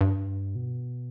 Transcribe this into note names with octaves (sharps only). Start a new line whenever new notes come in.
G2
B2